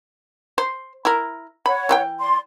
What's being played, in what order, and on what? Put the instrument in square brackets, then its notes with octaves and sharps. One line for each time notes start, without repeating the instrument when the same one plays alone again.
[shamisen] C5
E4 A#4
[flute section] C#5 F#5 [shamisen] B5
[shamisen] E3 E4 G5
[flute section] D5 C6